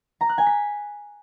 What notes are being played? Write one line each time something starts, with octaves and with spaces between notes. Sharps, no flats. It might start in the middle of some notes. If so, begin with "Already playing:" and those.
A#5
F#6
G#5
B6